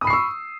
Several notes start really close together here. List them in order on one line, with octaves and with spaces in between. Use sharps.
D#6 B5 C7 C#6 E6